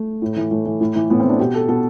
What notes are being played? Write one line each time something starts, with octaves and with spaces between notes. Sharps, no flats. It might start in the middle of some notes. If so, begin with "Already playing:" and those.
Already playing: A3
A2
E3
A2 A3
E3
A2
E3
A2 B3
C4
E3 D4
B2 G4
A4
B2 A4